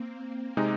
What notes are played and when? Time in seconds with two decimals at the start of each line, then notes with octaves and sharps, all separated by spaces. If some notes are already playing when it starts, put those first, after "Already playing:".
Already playing: A#3 C4
0.57 C3 G#3 D#4